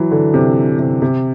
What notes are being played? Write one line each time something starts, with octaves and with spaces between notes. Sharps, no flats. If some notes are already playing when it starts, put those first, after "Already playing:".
Already playing: E3 F#3
D3
C3
C3
C3